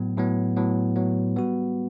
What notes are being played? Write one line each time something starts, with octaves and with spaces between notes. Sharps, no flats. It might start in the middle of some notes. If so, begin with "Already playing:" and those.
Already playing: A2 F#3 B3
A2 F#3 B3
A2 F#3 B3
A2 F#3 B3
G3 B3 F#4